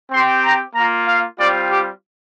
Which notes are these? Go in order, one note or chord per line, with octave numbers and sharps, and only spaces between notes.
C4 G4 C6
A#5
A#3 F4 A#5
F5
G3 C4 F4 D5
G4